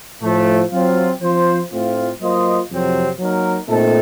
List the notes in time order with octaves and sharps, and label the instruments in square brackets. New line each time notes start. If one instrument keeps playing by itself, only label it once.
[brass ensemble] A2 F3 A3
F#3 C4 F4
F3 C4 F4 C5
A2 A3 C4 F4
F#3 A#3 F4 C5 D#5
F2 C3 F#3 C4
F#3 A#3 D#4 A#4
A#2 A3 C4 D#4 A4